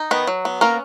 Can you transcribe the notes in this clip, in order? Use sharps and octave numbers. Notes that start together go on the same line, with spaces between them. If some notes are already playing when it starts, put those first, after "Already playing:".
Already playing: D#4
D#3 B3 B4
F#3
B3
A#3 C#4 A#4